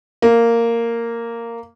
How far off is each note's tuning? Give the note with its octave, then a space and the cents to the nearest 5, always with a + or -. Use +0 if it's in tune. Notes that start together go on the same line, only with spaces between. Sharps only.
A#3 -10